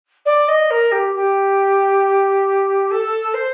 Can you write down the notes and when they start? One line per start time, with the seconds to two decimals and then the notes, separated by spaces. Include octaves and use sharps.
0.25 D5
0.48 D#5
0.70 A#4
0.91 G4
1.14 G4
2.90 A4
3.33 C5